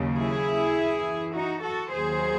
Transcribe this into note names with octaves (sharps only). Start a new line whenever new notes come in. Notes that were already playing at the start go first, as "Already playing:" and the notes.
Already playing: D#2 C#3 F#3
E4 G#4
F#2 E3
D#4 F#4
F#4 A4
D#2 D#3 F#3 G#4 C5